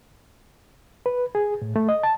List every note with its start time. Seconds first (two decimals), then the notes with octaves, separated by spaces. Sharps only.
1.06 B4
1.35 G#4
1.62 A2
1.76 A3
1.89 D#5
2.03 A5